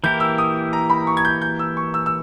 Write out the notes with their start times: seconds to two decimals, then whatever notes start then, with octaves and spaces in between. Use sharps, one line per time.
0.04 E3 A#3 E4 G4 A#4 G6
0.20 E6
0.38 D#6
0.73 A#5
0.90 B5
1.07 C#6
1.17 G#6
1.25 G6
1.42 G6
1.59 E6
1.77 C#6
1.94 E6
2.06 E6